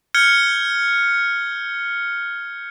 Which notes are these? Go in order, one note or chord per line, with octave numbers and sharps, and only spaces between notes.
F6 G6 G#6 C#7 G7